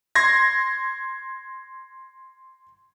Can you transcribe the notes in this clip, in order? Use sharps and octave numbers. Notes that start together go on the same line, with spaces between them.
C6 G#6 A#6